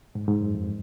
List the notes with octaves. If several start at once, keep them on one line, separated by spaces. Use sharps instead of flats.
G#2
G#2
F#2
F2